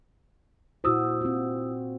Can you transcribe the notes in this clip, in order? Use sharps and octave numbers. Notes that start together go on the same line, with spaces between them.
A#2 E4 F#4 C5 D#6 E6
C4 F4